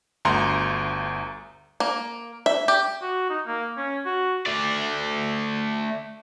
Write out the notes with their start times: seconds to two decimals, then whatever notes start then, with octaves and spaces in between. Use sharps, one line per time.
0.25 G1 D2 A#5 C6
1.80 A#3
2.46 E5
2.68 G4
3.02 F#4
3.30 D#4
3.47 A#3
3.77 C#4
4.06 F#4
4.46 A3 D5